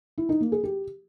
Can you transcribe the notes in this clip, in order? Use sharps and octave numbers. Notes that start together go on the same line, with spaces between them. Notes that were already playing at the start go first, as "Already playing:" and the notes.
E4
D#4
A#3
G#4
G4